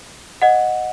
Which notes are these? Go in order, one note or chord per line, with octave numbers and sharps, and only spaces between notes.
D#5 F#5